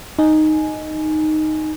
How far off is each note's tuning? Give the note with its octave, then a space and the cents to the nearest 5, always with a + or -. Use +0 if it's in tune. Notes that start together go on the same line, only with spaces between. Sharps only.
D#4 -5 G#5 +15